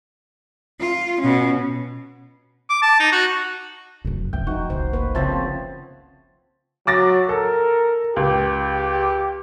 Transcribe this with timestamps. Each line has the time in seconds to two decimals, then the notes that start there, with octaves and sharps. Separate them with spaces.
0.80 F4
1.20 B2 C#4
2.69 D6
2.82 A5
3.00 D#4
3.12 F#4
4.05 F1 F#2 C#3
4.33 C3 F3 G5
4.47 D#1 D#2 D#4 F#4
4.70 F#1 C2 D#3 C5
4.93 A#3 B4
5.15 C#3 F3 C4 C#5 E5 A5
6.87 F#3 D6 A6 A#6
7.29 A4 A#4
8.16 C#2 G4